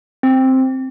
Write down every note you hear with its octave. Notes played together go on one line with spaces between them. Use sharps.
C4